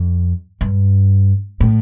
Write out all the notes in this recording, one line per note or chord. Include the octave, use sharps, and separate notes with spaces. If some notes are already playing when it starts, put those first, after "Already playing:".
Already playing: F2
G2
A2